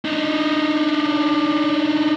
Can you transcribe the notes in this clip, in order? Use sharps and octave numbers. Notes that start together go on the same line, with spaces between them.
D4 D#4